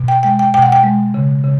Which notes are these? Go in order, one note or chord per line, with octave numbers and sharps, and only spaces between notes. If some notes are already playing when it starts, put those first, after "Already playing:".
Already playing: B2
G5
G#3 G5
G5
B2 G5
F#5
G5
G#3
C#3
C#3